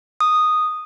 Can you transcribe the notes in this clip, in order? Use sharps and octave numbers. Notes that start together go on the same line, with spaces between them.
D#6